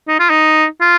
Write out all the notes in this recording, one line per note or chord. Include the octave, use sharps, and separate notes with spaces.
D#4
F4
D#4
F4